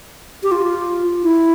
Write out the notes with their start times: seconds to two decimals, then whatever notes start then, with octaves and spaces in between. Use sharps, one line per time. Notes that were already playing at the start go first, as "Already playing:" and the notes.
0.43 G4
0.52 F4
1.23 E4